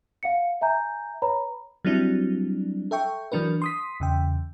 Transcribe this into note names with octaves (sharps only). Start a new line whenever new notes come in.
F5 F#5 C#7
E5 G#5 A#5 G6
B4 C#5 A#5 B5
F#3 G3 C4 D4 E4
A4 E5 G5 C#6
E3 F#3 D4 A#4 B4
C6 D#6 B6
E2 C#3 G5